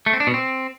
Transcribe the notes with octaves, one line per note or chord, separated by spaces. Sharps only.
A3
C4
D4
B2
C4